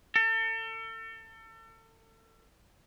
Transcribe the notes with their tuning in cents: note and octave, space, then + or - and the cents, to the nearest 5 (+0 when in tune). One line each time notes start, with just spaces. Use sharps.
A4 +35